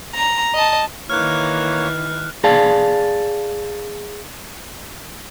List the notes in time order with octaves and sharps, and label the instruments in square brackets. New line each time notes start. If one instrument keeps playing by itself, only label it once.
[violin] A#5
D#5 A5
[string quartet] D#3 E3 [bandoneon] A#3 C#5 [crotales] F6 F#6
[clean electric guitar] G#4 D5 F5 A5